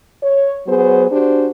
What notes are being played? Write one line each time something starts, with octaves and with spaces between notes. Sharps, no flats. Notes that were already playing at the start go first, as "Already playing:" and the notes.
C#5
F#3 B3 G#4 C5
D4 F#4 G4 C5